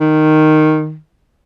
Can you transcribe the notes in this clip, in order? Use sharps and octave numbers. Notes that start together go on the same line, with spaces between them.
D#3